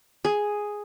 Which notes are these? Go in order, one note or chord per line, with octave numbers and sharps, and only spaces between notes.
G#4